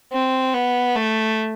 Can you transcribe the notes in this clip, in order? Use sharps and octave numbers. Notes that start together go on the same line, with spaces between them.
C4
B3
A3